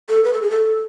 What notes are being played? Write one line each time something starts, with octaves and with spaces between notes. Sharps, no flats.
A4
B4
A4
G#4
A4